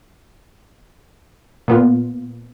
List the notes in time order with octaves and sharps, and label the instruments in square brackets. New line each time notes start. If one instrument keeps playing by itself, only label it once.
[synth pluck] A#2 B3 F4